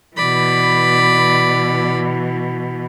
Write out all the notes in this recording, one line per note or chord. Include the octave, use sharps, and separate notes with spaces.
B2 E3 D5 B5